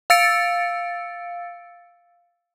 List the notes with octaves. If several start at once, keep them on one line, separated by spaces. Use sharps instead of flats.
F5 E6 A6 C#7 D7